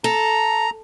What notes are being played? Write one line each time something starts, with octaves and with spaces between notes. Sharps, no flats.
A4 A#5